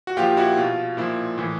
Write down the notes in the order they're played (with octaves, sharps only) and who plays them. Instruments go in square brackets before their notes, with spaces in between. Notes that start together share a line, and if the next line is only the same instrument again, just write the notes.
[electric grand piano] F#4
A#2 F3 F4 G4
E4 F#4
B2 F4
A#2 F3 E4
A2 E3